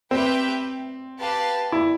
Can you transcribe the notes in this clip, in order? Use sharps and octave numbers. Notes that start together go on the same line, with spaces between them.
C4 G4 B4 E5 G5
G4 B4 F5 A5
E4